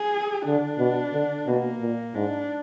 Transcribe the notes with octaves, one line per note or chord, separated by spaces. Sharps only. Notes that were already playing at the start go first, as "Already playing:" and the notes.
Already playing: G#4
D3 D4
B2
D3
B2 A#3
A#2
G#2 D4